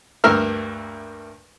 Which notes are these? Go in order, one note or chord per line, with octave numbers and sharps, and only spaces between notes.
D2 G2 A#3 A#4 E5 F6